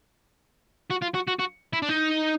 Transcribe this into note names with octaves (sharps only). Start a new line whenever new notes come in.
F#4
F4
F#4
F#4
F#4
E4
D4
D#4